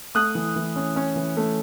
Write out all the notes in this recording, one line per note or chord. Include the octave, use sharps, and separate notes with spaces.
A3 D#6 F#6
E3
E3
C#4
C#4
E3
A3